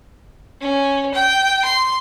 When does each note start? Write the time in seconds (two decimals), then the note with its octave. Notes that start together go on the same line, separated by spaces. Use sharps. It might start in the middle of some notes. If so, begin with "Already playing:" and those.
0.61 C#4
1.14 G5
1.65 C6